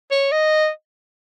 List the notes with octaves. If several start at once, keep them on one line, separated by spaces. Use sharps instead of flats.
C#5
D#5